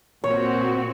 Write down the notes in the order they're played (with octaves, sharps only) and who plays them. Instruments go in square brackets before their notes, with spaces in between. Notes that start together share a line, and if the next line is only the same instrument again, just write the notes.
[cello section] A#2 C4 F#4 [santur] C#5